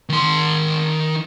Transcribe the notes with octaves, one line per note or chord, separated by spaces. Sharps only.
D#3 C6